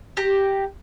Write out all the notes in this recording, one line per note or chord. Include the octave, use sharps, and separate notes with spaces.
G4 A#5